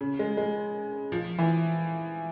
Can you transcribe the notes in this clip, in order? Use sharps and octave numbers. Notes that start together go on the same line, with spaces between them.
C#3
G#3
G#3
F3
E3